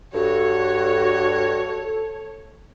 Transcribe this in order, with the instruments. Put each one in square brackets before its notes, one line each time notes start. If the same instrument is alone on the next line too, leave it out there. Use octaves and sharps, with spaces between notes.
[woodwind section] G2 [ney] F#4 [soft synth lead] A4 [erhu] C#5